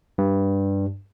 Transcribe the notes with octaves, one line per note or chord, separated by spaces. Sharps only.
G2